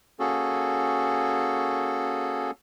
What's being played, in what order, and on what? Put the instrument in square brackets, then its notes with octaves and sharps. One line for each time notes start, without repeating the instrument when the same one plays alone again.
[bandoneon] A#3 C#4 F#4 G#4 A4